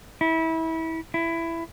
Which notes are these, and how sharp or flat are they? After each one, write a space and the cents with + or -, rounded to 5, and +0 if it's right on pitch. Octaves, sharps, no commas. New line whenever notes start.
E4 -25
E4 +15